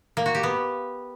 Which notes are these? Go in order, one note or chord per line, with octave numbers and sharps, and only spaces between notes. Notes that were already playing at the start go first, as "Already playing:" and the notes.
A#3
F#4
G4
B3